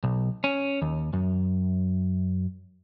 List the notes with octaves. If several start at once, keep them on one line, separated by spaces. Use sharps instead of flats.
B1
C#4
D#2
F#2